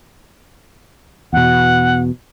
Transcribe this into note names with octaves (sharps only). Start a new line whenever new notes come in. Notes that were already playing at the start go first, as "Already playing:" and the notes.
E2 B2 F#5